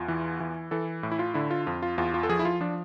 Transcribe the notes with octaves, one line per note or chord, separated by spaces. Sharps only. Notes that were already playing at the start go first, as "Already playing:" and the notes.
Already playing: E2 F4
E3
E3
E3 A4
A2
E4
F4
D3 E4
F4
F2 F4
F4
E2 F4
F4
A4
F3 G#4
E4
F4
F3 D4